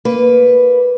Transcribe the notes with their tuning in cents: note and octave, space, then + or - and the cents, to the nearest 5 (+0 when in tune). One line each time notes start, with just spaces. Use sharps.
A#3 +0 B4 +0